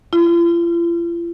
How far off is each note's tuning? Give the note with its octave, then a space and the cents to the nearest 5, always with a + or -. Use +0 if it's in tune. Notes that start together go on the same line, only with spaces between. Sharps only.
F4 -45